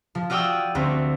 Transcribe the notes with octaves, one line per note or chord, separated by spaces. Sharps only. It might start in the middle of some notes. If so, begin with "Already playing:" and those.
F3
F4 F#4 D5 G5 D#6 E6
D2 C4 F#4